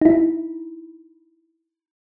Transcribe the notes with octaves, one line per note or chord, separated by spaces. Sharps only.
D#4 E4